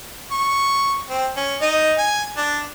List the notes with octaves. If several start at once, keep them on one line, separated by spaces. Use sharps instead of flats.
C#6
C4
C#4
D#4 D#5
G#5
D4